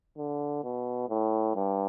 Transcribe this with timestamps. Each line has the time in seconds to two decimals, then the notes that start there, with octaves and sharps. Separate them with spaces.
0.17 D3
0.63 B2
1.09 A2
1.55 G2